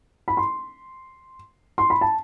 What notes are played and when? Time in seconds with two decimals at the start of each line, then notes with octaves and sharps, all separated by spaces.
0.28 B5
0.37 C6
1.78 C6
1.90 B5
2.01 A5